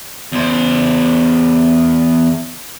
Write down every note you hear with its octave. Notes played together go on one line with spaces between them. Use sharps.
E2 C5